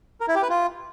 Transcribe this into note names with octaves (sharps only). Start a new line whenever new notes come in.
A#4
E4
G4
B4
F4